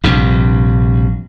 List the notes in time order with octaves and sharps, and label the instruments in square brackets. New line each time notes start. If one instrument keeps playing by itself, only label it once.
[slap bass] A#1 G2 C3